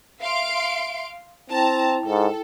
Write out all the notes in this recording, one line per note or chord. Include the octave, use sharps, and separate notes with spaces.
E5 F5 C6 D7
C4 E4 G5 A5 A#5
G#2 A4